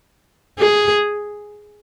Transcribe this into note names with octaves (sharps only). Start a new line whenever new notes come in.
G#4